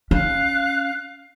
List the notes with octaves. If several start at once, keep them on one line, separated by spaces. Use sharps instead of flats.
C#4 F5 F#6